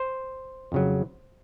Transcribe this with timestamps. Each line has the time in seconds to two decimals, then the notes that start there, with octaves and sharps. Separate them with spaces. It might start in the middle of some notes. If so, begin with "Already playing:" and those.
Already playing: C5
0.72 F2 C#3 F#3